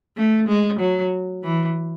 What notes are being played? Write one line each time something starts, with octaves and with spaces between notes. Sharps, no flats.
A3
G#3
F#3
E3